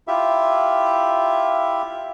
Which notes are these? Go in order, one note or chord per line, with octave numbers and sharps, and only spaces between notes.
E4 F4 G4 E5